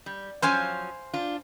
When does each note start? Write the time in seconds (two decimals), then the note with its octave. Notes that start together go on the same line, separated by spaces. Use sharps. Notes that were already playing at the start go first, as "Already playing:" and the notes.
0.06 G3
0.42 F3 F#3 C#4 C5 F5 G#5
1.13 D4 F4